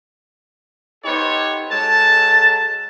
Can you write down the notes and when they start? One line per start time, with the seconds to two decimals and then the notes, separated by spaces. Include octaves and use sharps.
1.05 B3 D#4 G4 A4 C5 C#5
1.70 F#3 G#3 A4 A5